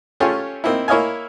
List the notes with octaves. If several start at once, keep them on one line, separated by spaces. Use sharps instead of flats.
A3 C#4 F4 G4 G#4 C#5
A#3 C4 D#4 E4
A#3 E4 C#5 D#5 F5 G#5